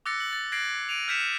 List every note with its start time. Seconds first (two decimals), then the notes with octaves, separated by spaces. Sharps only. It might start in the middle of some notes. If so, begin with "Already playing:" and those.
0.06 D6 E6 F#6 A6 A#6 C#7
0.20 F#7
0.33 A6
0.52 F#6 G#6 A#6 C7 D7 F#7
0.89 D7 D#7 F7
1.08 F6 G6 B6 C#7 E7